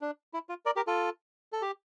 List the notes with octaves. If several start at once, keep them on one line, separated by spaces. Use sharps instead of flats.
D4
E4
F4
A#4 D5
G4 A#4
F4 A4
A4
G4